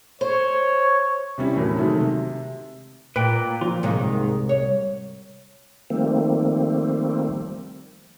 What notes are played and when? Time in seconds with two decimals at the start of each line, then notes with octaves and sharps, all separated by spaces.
0.21 C5 C#5
1.38 C3 G3 C#4 E4
1.56 E2 A2 F#3 A#4
1.76 C3 D#3 F#3 G#3 A3
2.00 C3
3.16 A#2 B4 G5
3.61 F3 F4
3.83 C2 G#2 D#3 A#3
4.49 C#5
5.90 D#3 F3 G3 A3 A#3 C4